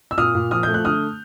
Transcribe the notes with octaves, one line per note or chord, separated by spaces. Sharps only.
E6
A#2 D#6 F6
A#2
F3 D#6 F6
A3 G6
F#6
D3 D#6 F6